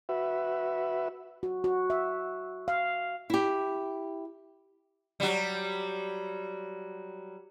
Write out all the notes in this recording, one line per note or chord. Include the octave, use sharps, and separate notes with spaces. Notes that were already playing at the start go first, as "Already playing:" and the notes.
F#4 B4 E5
F#4
F#4
E5
F5
E4 G4
F#3 G3